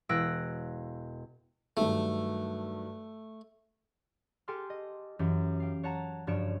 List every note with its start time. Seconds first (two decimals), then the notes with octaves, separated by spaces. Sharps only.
0.09 E1 E6 F#6 A#6 D7
1.77 G2 D#3 F#3 A3
4.48 G4 A4 G5 G#5 C6 F6
4.70 D#5
5.19 F#2 E3 G4
5.60 F5 G5
5.83 C#5 F#5 A5 A#5
6.27 F#1 G2 F3 C#5 D7 E7